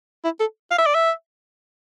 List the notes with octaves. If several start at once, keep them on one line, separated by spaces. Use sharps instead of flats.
E4
A4
F5
E5
D5
E5